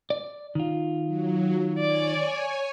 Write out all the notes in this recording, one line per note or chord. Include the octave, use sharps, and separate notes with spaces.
D5
D#3 F4
F#3
C#5 D5 G#5